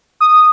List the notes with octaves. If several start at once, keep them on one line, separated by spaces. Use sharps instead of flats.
D#6